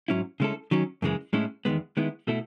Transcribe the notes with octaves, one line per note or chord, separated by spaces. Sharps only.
G#2 F#3 C#4 E4
C#3 G#3 C#4 E4 A4
D#3 F#3 C#4
F#2 C#3 E3 G#3
A2 G#3 C#4 E4
E2 D#3 G#3 B3
D#3 G#3 B3 E4
B2 A3 E4 A4